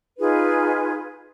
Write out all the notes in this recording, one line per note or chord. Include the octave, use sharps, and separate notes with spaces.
D#4 F4 G#4 B4